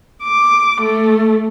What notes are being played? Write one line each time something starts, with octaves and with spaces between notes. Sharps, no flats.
D6
A3